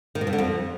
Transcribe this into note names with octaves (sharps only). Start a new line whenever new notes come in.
D#3
B2
G2
D3
F2